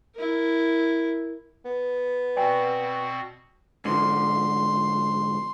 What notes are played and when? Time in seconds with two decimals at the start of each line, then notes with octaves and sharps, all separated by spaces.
0.16 E4 A#4
1.65 B3
2.36 B2 C4 F#4 D5 G5 G#5
3.85 G#2 D3 F3 C6